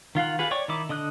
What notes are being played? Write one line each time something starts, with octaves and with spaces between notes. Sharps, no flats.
D#3 F4 F5 F#5
F4 G4 G#4 B4 F#5
C#5 D5 G5 C#6
D#3 D#4 E4 D6
D3 D#5 D#6 F#6